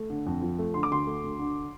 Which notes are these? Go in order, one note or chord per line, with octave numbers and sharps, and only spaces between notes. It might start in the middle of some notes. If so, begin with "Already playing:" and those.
Already playing: A3
D3
F2
F3
A3
D3 C6
D6
D2 C6
A3
D2
D3